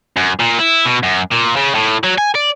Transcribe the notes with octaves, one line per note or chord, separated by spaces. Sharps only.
F#2
A#2
E4
B2
F#2
A#2
C#3
A2
F#3
G#5
D5